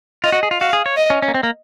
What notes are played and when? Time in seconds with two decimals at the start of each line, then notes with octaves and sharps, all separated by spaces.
0.24 F4 D#5
0.32 F#4
0.43 G#4
0.51 F4
0.60 F#4 F5
0.73 G#4
0.86 C#5
0.97 D#5
1.10 C#4
1.22 C#4
1.28 A#3
1.34 C4
1.43 A#3